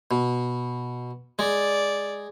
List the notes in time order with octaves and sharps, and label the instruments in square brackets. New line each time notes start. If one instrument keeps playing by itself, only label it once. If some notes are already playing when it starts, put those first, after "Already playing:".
[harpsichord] B2
[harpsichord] G#3 [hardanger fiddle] D5